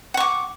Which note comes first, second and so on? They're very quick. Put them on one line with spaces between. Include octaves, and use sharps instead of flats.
F#5 C#6 D6